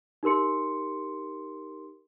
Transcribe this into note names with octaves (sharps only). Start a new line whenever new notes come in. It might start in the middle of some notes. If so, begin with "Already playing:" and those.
D#4 G4 A#4 C6 C#7